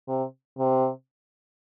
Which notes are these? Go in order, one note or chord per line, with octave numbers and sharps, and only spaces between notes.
C3
C3